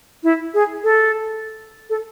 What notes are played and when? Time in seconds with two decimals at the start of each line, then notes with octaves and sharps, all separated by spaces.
0.23 E4
0.54 G#4
0.84 A4
1.90 A4